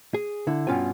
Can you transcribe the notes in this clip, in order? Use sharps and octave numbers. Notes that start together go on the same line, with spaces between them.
G#4
D3 E4
G2 B2 C#4 F4 G5 G#5